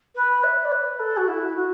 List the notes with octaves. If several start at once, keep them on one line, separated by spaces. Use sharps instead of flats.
B4
E5
D5
B4
A4
F#4
E4
F#4